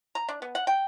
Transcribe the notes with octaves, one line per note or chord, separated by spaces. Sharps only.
A#5
D4
B3
F#5
G5